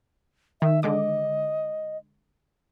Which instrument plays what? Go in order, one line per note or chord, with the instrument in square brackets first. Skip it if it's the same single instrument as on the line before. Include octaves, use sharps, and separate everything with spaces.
[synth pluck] D#3 [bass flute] E5
[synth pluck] D3 G#3 D6 [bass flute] D#5